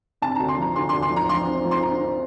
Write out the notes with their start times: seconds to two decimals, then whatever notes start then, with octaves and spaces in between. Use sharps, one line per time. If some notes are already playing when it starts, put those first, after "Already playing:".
0.22 C3 A5
0.35 A#5
0.40 D2
0.48 C6
0.58 F3 A#5
0.76 D2 C6
0.89 C6
0.94 D2
1.02 C6
1.11 F3
1.16 A#5
1.29 F3 C6
1.47 C4
1.65 F3
1.71 C6
1.82 C4 A#5
2.01 C4